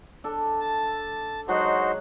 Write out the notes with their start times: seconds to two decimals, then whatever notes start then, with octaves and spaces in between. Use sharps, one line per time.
0.24 D4 A4
0.61 A5
1.48 F#3 G#3 D#4 F#4 C5 F#5